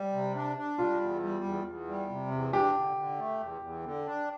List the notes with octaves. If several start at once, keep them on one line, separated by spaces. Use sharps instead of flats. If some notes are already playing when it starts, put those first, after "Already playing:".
Already playing: G3
C3
D4
D4
G3 F4
E2
G3
E2
E2
G3
C3
E2
D4 G4
D3
D3
A3
E2
E2
D3
D4